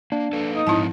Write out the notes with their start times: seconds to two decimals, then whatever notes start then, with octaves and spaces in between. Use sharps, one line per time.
0.12 A#3 D4
0.33 A#3 A4 B4
0.54 D#4
0.67 G#2 F3 C4 E4 C#5 A5